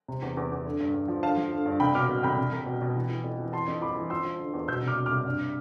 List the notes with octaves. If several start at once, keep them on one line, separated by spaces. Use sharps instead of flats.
C3
E2
E2
E2
D3
G2
G2
F3
D3 F5 A5
F3
D3
G2
C2 G5 B5
B2 D6 F6
B2
C2 G5 B5
C2
C2
B2
B2
E3
E3
F2
E3
E3 A5 C6
F2
E3 B5 D6
E3
F3 C6 E6
F3
D3
E2
B2 E6 G6
C2 D6 F6
B2
D6 F6
C2
G2